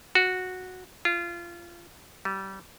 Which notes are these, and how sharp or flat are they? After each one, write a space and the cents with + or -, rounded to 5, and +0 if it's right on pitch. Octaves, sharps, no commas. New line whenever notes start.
F#4 -10
F4 -25
G3 -25